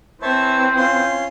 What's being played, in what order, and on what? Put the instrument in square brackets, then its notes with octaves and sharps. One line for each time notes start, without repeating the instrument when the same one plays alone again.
[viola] E3 C4 [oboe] C5 [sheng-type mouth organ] C#5 E5 A5
[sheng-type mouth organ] C#4 F4 C6